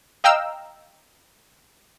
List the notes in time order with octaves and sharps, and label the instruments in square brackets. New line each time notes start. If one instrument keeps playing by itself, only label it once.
[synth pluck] D#5 F5 G5 A#5 E6 F6